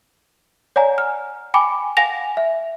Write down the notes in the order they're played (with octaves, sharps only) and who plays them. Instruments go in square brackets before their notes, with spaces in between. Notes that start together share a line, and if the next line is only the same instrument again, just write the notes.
[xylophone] C#5 D5 F#5 G#5 A#5
F6
G5 G#5 B5 D6
F5 F#5 G#5 A#6 F7
E5